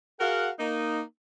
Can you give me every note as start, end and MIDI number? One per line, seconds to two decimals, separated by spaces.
0.20 0.50 66
0.20 0.50 68
0.20 0.50 70
0.20 0.50 77
0.20 0.50 78
0.59 1.01 58
0.59 1.01 63